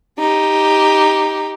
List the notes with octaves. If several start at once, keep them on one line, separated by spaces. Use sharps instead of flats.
D#4 G4